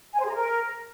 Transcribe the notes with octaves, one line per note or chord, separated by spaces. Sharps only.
G#5
C5
G#4
A#5
A#4